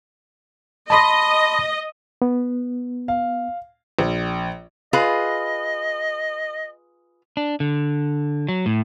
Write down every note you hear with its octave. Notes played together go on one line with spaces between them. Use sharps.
D#5 A5 B5 C6
B3
F5
A#1
F4 G#4 B4 D#5
D4
D3
F#3
A2